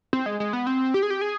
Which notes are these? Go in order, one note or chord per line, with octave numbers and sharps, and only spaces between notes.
C4
G#3
G#3
B3
C4
G4
G#4
G4
G#4